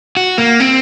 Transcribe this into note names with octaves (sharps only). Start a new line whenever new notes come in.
F#4
A#3
C4